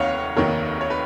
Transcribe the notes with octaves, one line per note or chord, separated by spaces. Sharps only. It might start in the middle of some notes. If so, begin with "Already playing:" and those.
Already playing: F1 D#2 D#3 C#5 F5 F#5
F1 D#2 D#3 A#4 C#5
C#5
B4